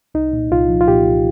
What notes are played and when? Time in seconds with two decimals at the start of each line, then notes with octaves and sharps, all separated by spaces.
0.15 C2 D#4
0.33 A#2
0.51 C2 F4
0.69 F3
0.81 F4
0.88 A#2 G4
1.06 C2